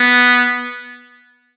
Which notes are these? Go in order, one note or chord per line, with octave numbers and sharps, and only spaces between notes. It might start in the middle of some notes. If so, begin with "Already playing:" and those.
Already playing: B3